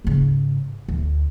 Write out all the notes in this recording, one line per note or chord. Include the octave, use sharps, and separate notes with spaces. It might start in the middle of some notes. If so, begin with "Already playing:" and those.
G#2 C#3
D2